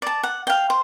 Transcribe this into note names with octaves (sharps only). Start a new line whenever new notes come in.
D5 A5
F#5
F5 G5
C5